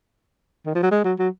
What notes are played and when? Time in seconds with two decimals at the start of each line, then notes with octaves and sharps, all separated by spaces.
0.66 D#3
0.75 F3
0.83 F#3
0.91 G#3
1.04 F#3
1.19 F#3